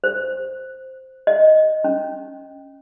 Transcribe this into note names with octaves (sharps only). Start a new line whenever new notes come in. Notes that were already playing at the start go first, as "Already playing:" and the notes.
C5
D#5
C#4